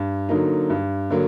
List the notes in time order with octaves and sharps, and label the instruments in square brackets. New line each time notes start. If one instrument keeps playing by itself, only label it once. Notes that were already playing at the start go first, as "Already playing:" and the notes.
Already playing: [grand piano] G2
D3 F#3 A#3 D#4
G2
D3 F#3 A#3